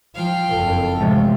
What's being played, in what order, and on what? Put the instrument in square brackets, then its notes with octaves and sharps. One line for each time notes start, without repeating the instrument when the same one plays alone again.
[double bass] F3 [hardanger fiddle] F5 G5
[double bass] F#1 F2 [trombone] A4
[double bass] A1 G#3 [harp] C3 F3 A3